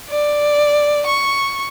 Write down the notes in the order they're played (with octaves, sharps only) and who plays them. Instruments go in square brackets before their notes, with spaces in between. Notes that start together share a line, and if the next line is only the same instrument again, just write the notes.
[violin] D5
C#6